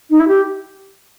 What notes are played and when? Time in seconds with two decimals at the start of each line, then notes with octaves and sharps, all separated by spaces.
0.09 D#4
0.19 E4
0.27 G4